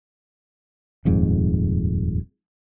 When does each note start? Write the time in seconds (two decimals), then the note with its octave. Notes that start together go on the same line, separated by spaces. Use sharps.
1.05 D#1 F2 G#2